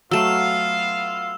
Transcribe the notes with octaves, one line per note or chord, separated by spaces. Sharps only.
F#3 A3 B3 F4 F5 E6 E7